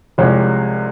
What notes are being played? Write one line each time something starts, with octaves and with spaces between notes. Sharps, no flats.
C2 C3 F3 G#3 C#4